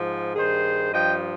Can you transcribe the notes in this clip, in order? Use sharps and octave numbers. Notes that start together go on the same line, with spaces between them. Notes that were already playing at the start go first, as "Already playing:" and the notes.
Already playing: G#2 F3
G2 D#3 G#4 C5
G2 F3 D#5 G5